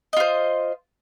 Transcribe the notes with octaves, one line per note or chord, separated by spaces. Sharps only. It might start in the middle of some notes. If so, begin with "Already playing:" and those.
F4 C5 D#5